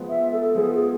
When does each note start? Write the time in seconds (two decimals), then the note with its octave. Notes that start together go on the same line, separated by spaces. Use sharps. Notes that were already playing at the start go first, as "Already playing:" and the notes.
Already playing: F3 G#3 B3
0.09 E5
0.32 A4
0.55 F3 G#3 B3 G#4
0.73 G#4